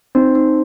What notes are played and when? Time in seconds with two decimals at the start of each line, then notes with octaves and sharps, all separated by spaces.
0.15 C4 D#4
0.35 D#4